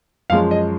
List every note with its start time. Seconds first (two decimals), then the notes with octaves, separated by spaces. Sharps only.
0.30 F#2 F3 G#3 F5
0.51 D#5